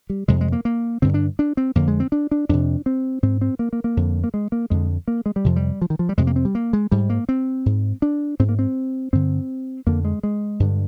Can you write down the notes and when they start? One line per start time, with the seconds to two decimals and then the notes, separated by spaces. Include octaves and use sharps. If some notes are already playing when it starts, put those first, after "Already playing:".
0.10 G3
0.28 F2 C3 G#3
0.41 G#3
0.52 A#3
0.65 A#3
1.02 G2 D3 C4
1.14 D4
1.39 D4
1.57 C4
1.75 F2 D3 A#3
1.88 G#3
2.00 C4
2.12 D4
2.31 D4
2.49 F2 C3 D4
2.86 C4
3.23 G#2 C4
3.41 C4
3.59 A#3
3.73 A#3
3.84 A#3
3.97 F2 D3
4.24 A#3
4.34 G#3
4.52 A#3
4.70 F2 D3 G#3
5.08 A#3
5.26 G#3
5.36 G3
5.44 F2 C3 F3
5.56 G3
5.82 F3
5.90 D#3
5.99 F3
6.09 G3
6.17 F2 C3 G#3
6.27 A#3
6.36 C4
6.45 G3
6.55 A#3
6.73 G#3
6.92 G#2 G3
7.10 A#3
7.29 C4
7.66 G#2
8.02 D4
8.39 G#2 C4
8.49 A#3
8.59 C4
9.13 G2 D3 C4
9.86 F2 D3 A#3
10.05 G#3
10.23 G#3
10.60 G2 D3